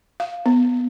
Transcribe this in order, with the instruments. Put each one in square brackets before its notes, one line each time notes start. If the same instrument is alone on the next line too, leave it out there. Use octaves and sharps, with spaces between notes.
[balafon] F5
B3